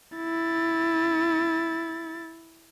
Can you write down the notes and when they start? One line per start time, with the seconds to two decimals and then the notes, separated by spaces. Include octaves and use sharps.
0.17 E4 A6